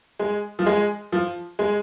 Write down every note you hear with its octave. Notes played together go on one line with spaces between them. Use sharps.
G#3
F3
G#3
F3
G#3